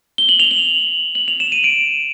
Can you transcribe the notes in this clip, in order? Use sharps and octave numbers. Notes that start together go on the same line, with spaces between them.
G7
F#7
F7
F#7
F#7
F7
E7
D#7
D7